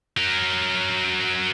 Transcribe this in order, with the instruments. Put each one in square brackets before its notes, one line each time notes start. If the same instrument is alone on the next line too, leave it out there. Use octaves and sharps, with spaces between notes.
[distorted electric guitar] F#3 A#4